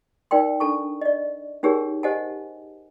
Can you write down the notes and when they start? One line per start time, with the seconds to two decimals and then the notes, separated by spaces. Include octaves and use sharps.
0.31 D#4 A#4 D5 G5 C6
0.60 D4 A4 A5 C#6
1.01 D5 D#5
1.63 C#4 D#4 G4 G#4 A#4 C#5
2.03 G4 C5 D#5 F#5 G#5 A5